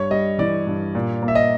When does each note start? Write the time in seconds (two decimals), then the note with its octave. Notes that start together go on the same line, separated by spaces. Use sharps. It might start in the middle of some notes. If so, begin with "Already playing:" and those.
Already playing: G2 C#5
0.11 G3 D#5
0.39 E3 D5
0.67 G2
0.95 A#2
1.22 A#3
1.28 E5
1.35 D#5